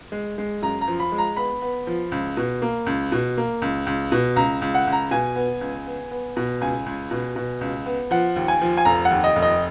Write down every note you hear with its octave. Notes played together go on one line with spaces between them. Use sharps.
G#3
G#3
F#2 A#5
A#5
F3
B5
G#3
A#5
B3 B5
B3
F3
C#2
B2
A#3
C#2
B2
A#3
C#2
C#2
B2
C#2 A#5
C#2
F#5
C#2
A#5
B2 G#5
B3
C#2
B3
B3
B2
C#2 G#5
C#2
B2
B2
C#2
B3
F3 F#5
D#2
G#5
F3
G#5
F1 A#5
F#5
D#2
D#5
F1
D#5